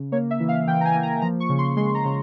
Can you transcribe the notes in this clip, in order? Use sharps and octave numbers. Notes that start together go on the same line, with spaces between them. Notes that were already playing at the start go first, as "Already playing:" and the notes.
Already playing: C#3
A#3 C#5
E5
E3
F5
E3 G5
A#5
G#5
A#3
A#5
F3 A#5
C#6
C#3
C6
G#3 C6
A#5
C#3